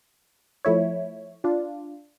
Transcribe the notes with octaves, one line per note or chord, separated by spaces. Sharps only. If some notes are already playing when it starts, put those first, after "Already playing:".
F3 A3 E4 C#5
D4 F4